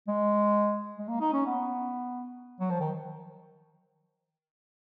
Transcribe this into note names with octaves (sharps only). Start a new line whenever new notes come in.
G#3
G#3
A#3
D#4
C#4
B3
F#3
F3
D#3